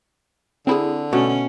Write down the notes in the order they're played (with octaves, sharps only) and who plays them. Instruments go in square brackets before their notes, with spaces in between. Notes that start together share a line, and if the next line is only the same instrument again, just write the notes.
[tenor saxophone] D3 [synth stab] C4 E4 G#4
[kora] B2 A3 [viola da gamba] C#4